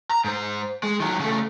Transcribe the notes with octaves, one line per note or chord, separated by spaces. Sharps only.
A#5
G#2 C5
G#3
D#3 F#3
C#3 A3